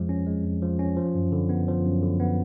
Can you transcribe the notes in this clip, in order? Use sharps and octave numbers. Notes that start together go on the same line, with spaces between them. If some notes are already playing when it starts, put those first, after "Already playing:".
Already playing: F2 F3 G#3
C#4
G#3
F2
F3
C#4
F3
F#2
D3
B3
F3
F#2
D3
B3